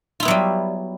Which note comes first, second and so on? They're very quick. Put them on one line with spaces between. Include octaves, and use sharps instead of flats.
F4 E4 B3 F#3 G3